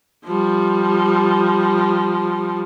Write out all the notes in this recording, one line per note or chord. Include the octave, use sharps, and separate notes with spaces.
F3 G3